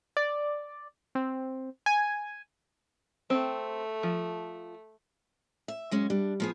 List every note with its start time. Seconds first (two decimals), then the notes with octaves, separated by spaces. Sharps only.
0.17 D5
1.15 C4
1.86 G#5
3.30 A3 C4
4.03 F3
5.68 E5
5.91 F#3 G#3 C#4
6.10 G3 D4
6.40 F3 B3 G#4